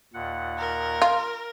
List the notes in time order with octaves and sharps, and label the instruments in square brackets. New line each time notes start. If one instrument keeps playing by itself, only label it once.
[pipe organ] D#2 A#2 F#5
[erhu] A#4
[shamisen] F4